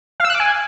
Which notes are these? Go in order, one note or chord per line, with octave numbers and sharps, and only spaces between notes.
F5
E6
F#6
D6
G#5